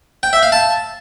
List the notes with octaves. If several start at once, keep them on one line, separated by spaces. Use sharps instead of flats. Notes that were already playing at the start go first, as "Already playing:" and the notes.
G5
E5
F5
A5